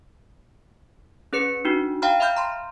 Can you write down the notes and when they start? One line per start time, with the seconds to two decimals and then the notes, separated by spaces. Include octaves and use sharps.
1.33 C#4 G#4 B4 C#7
1.65 D4 D#4 F#4
2.02 F5 G5 A#5 B5 F6
2.20 E5 F5 B5 F6 G6
2.36 A#5 C6